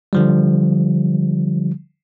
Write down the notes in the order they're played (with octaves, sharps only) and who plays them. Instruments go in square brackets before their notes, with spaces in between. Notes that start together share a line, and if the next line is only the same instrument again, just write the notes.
[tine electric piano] D3 F3 G3